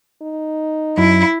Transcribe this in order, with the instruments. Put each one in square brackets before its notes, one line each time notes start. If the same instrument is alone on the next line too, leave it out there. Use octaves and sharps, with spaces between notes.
[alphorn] D#4
[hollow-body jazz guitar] F#2 [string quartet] E4